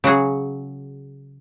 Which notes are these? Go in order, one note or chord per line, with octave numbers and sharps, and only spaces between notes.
C#3 F#3 F#4 G#4